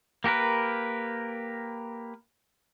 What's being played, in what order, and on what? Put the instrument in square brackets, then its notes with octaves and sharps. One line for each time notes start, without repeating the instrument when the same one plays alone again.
[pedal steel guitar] A#3 G4 A#4 B4